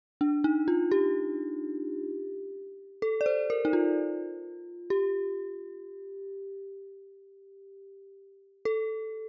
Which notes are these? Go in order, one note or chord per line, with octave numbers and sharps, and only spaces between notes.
D4
D#4
F4
G4
A4
D5
C5
A#4
D#4
F4
G4
A4